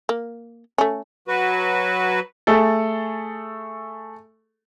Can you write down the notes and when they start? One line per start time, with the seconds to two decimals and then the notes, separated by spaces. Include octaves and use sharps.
0.09 A#3
0.78 A3 C#4
1.28 F#3 F#4 B4
2.47 A3 G#4 A4